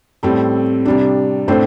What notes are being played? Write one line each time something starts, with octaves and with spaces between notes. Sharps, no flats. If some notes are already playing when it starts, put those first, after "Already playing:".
A2 G3 C4 A4
C3 G3 D4
A2 A3 C4 D4 C5